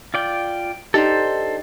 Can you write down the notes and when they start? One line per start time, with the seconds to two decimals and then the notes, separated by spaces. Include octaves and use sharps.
0.14 F4 D5 G5
0.94 D4 D#4 G4 A4 C5